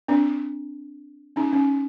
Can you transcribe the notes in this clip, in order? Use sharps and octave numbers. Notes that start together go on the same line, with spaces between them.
C4 D4
C#4 D#4
C#4